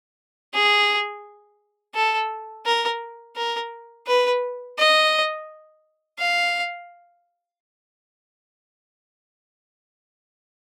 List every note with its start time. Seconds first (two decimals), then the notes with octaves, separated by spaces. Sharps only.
0.54 G#4
1.95 A4
2.66 A#4
3.36 A#4
4.07 B4
4.78 D#5
6.19 F5